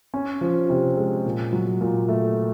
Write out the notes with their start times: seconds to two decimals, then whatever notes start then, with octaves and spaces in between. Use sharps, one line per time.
0.14 C#4
0.41 F3
0.69 C3
0.97 G#3
1.25 A#2
1.53 F#3
1.81 A#2
2.08 A3